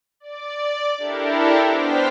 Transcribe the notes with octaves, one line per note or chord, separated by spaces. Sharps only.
D5
D4 E4 G4 A4 A#4
B3 D4 C5 G5 F6 B6